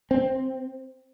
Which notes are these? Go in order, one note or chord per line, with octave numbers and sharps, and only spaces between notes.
C4